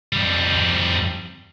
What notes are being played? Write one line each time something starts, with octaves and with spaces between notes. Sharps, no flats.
F2 G3